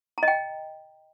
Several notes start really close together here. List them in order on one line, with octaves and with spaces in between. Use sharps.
A#5 D#5 G5